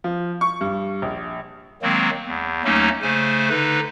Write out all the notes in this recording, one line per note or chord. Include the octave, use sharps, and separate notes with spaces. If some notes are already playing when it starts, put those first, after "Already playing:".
F3
C#6
G2
A#1
D#3 F#3 G#3 A#3 C4
E2
D#2 F#3 A3 A#3 C#4 D#4
C#3 A3 C5 G#5
D3 D#4 B4